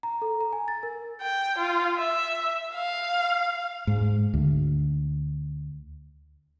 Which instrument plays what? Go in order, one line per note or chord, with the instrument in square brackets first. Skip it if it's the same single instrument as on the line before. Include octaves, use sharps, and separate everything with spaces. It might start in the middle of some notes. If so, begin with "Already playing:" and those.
[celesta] A#5
A4
A#5
G#5
A6
A#4
[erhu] G5
F4
E5
F5
[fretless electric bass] G#2
D2